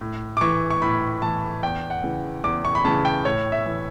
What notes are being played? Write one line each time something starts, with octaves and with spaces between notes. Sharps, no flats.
A2
D6
E3 C#6
C#6
A2 B5
E3 A5
E2 G5
F#5
C#3 E3
E2 D6
C#6
B5
C#3 E3 A5
G5
A2 C#5
E5
E3